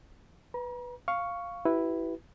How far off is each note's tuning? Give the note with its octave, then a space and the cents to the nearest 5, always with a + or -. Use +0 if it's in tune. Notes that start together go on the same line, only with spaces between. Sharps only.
B4 +0 A#5 +40
F5 +0 C#6 +5
E4 +0 G4 -40 B4 +0